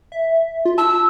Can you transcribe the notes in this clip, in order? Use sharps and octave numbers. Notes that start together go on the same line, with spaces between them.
E5
F4
A5 E6